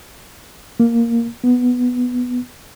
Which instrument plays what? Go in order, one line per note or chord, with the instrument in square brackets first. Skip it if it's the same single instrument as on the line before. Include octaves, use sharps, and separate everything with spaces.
[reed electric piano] A#3
B3